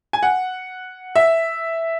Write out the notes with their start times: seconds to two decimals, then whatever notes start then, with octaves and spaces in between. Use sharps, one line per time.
0.13 G#5
0.23 F#5
1.15 E5